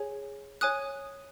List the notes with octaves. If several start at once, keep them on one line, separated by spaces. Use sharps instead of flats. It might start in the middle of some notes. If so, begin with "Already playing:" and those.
Already playing: G#4 C#5 G#5
C#5 G#5 D#6 F#6